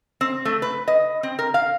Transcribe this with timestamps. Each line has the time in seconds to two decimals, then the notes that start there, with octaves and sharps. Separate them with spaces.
0.21 C4
0.45 A3
0.62 B4
0.88 D#5
1.23 C4
1.39 A#4
1.54 F5